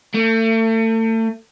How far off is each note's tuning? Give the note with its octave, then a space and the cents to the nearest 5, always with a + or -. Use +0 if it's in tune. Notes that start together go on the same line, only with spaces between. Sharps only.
A3 +35